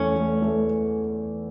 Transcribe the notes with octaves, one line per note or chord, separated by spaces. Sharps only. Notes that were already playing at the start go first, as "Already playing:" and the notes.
Already playing: E2 A3 C#4
A3
A3